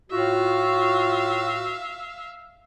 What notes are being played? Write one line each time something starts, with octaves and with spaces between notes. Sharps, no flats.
A2 F4 F#4 E5 F5